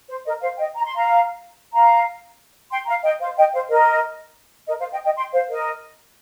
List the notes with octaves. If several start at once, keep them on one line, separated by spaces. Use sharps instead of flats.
C5
A#4 D#5
C5 F5
D#5 G5
A#5
C6
F5 A#5
F5 A#5
G5 C6
F5 A#5
D#5 G5
C5 F5
D#5 G5
C5 F5
A#4 D#5
A#4 D#5
C5 F5
D#5 G5
D#5 G5
G5 C6
C5 F5
A#4 D#5